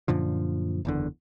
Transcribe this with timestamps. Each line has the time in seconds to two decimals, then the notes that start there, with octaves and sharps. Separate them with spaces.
0.08 F#2 A#2 D3 F3
0.85 F#1 E2 D3